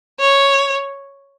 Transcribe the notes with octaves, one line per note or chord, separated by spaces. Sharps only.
C#5